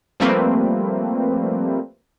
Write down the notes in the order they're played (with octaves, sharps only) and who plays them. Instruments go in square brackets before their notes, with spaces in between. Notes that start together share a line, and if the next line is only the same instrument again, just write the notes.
[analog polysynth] F3 G3 A3 A#3 C4 B4